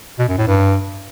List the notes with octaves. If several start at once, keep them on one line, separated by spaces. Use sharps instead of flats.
B2
F#2
A2
G2